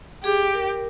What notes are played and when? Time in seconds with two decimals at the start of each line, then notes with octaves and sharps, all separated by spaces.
0.24 G4 G#4
0.54 A#4